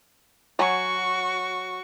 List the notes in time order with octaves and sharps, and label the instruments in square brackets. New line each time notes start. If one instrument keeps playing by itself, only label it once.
[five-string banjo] F#3 G#5 [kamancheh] F#4 C#6